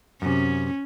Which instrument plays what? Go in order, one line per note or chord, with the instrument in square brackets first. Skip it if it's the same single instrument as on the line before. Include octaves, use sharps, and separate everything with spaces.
[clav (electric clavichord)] F#2 C3 [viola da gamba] C#4